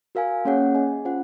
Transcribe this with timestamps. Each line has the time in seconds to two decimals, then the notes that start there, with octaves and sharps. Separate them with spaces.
0.15 F#4 A#4 F5 G#5
0.45 A#3 C#4 G#4 C#5 F#5
0.75 G#4 D#5 G#5
1.05 C#4 F4 C5 F#5